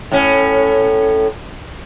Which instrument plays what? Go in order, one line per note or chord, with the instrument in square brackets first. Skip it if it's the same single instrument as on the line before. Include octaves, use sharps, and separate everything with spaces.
[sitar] A2 C#4